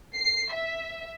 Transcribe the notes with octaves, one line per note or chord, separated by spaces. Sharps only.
C7
E5